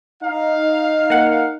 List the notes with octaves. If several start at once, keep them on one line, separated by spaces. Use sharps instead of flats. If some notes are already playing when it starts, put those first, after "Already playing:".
D#4 F5
A#3 F#5